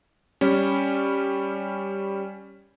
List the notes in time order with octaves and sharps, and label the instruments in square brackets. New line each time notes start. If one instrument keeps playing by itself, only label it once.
[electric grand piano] G3 C#4